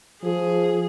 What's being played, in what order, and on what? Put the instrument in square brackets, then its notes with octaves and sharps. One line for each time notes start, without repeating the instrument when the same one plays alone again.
[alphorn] F3 [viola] G#4